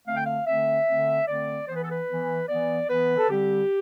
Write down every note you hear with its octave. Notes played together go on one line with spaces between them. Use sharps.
D3 A3 C4 F5
G5
F5
D3 A3 C4 E5
D3 A3 C4
D3 A3 C4 D5
E3 B3 C5
B4
A4
B4
E3 B3
E3 B3 D5
E3 B3 B4
A4
D3 G3 C4 G4